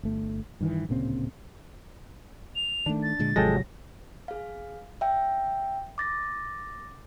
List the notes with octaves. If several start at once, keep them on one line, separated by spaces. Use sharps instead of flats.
G1 A3
G2 D#3 E3
D1 A#2 C#3 C4
F7
D#3 A3 D4
A6
A#2 D3 G#3
G#1 C3 F3 F#3 G#3 A4 G5 A#6
G#4 F5
E5 G5
D6 A6 A#6